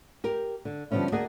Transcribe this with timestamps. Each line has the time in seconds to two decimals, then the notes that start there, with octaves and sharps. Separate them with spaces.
0.24 G4 A#4
0.65 D3
0.91 D3 F3 G3 B3 C#4 E4
1.12 D2 A#3 G#4 D5 D#5 F#5